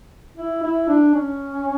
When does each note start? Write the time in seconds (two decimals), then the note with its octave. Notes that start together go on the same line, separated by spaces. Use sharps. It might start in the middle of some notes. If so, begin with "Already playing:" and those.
0.37 E4
0.63 E4
0.88 D4
1.15 C#4